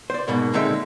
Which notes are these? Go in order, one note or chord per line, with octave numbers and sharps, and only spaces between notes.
C5 D5
G#2 B2 A#3
A#2 D3 G#3 C4 D#4 E5